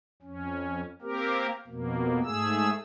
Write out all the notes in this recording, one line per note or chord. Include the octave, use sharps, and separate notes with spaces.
F2 C#4
A#3 C4 G4 A#4
F2 B2 A#3
G#2 A3 G#4 E6